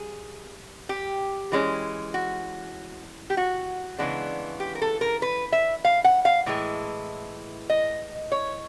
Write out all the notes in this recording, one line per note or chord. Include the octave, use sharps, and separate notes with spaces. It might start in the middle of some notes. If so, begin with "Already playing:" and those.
Already playing: G3 G#4
G4
E3 G#3 C#4
F#4
G4
F#4
C#3 E3 G#3 B3 D4
G4
A#4
A4
A#4
B4
E5
F5
F#5
F5
A2 E3 G#3
D#5
C#5